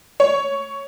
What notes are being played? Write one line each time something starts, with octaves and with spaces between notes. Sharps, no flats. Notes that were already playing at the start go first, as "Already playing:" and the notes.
C#5